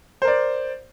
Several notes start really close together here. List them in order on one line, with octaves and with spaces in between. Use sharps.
C5 A#4 D5